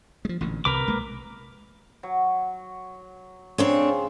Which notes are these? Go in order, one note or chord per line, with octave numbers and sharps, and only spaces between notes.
F3 G#3
A1 A#2 D3
C2 C3 A#4 B4 D6
B1 G#3 A#3
F#3
C#3 F3 C4 D4 C#5